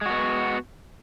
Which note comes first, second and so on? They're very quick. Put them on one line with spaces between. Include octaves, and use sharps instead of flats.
G#3 F#4 B3